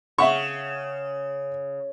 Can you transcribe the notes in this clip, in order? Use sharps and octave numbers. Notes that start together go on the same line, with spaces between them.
C#3 E5 F#5 C#6